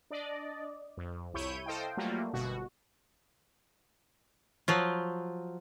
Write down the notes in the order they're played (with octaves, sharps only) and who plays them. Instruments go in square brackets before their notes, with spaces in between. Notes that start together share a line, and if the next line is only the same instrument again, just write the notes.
[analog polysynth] D4 D5 D#5
F2
C2 E4 C#5 G6 D#7
A4 C5 D#5 F5 G5
F#3 G3 A3 A#3 F4
G1 B2 F#4
[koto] F3 F#3 F4